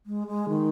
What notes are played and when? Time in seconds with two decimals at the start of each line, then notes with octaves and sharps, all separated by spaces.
0.06 G#3
0.27 G#3
0.49 D#3